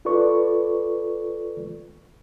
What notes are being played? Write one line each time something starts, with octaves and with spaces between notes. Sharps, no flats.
F4 A4 B4 D5 C#6